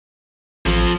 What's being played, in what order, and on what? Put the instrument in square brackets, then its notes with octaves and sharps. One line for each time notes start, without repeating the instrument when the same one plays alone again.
[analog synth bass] A1 [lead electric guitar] F2 F3